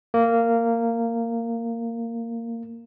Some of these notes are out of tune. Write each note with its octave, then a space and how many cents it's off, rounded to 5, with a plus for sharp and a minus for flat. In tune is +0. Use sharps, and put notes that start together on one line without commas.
A#3 -15